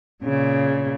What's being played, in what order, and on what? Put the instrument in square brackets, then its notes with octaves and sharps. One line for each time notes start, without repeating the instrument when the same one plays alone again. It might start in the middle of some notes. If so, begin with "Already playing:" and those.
[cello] A#2 C#3